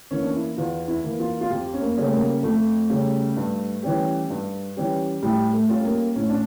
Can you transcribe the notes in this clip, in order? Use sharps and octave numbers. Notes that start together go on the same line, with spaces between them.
E3 A#3 C#4
D4
E4
E2 F4
E4
E3 A#3
F4
F4
F2 G4
C#4
A#3
C#3 G3 C#4
A3
A#3
F2 A3
C#3 G3 C#4
G2
E3 G3 C#4 G4
G2
E3 G3 C#4 G4
A2 G3
A3
G3 C#4 F4 A4
A#3
A2 C#4
D4